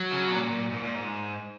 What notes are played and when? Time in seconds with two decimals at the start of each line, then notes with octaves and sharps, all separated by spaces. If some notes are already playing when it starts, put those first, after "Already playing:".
Already playing: F#3
0.12 C#3
0.28 B2
0.32 A#2
0.51 A#2
0.71 G#2
0.83 A#2
0.95 G#2